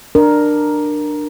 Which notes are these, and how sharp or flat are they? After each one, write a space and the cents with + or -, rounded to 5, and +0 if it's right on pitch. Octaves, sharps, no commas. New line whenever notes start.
D4 +20 A#4 +5